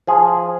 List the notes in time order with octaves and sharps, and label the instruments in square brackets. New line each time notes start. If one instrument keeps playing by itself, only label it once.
[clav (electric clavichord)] F3 G#4